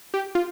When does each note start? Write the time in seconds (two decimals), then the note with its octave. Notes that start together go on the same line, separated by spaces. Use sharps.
0.14 G4
0.35 F4